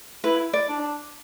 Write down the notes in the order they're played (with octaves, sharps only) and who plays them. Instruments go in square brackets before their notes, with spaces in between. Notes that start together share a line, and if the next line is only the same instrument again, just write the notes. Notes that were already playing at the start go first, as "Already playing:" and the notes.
[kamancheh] E4 [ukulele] B4
[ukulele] D5
[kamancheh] D4